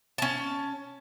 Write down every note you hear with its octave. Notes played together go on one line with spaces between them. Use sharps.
C#4 A5